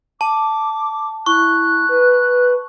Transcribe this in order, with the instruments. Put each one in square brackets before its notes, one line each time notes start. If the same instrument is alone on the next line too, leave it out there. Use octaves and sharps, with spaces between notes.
[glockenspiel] A5 [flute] D6
[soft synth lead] E4 [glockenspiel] C#6 [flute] F#6
[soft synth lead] B4